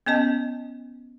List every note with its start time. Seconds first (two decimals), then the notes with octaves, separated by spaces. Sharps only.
0.06 B3 C#4 D#5 A5